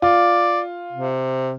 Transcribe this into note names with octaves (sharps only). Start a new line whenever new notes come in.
F4 D5
C3